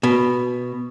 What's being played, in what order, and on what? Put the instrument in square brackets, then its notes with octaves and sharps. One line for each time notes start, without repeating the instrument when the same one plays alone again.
[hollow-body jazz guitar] B2